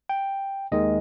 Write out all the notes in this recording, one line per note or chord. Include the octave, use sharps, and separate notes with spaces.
G5
D#2 D#3 G#3 D#5